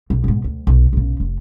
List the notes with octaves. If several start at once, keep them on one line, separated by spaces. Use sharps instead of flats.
B1
G#2 B2
D2
B1
B1 C#3
F1